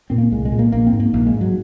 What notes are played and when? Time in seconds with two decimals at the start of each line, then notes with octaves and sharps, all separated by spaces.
0.10 A#2 C4
0.18 A#3
0.32 C2 G#3
0.45 G#3
0.52 A#2
0.59 A#3
0.72 A#1 A#3
0.87 C4
0.93 G#2
1.00 A#3
1.13 A#1 A#3
1.27 G#3
1.34 G#2
1.41 F#3